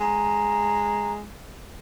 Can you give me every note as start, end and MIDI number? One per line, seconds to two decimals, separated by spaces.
0.01 1.23 56
0.01 1.12 82